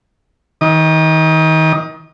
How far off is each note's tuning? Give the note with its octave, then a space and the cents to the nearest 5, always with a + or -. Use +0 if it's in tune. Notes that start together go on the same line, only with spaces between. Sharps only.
D#3 +30 D#6 -25